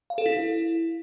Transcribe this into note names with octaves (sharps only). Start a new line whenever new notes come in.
F5
A4
E4